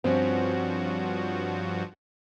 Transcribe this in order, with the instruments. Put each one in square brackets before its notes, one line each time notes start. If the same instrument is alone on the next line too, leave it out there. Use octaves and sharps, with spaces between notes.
[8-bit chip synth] G2 F3 F#4 [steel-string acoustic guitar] C4 C#4